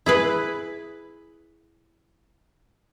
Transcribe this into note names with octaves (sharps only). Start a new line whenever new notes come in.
E4 G#4 B4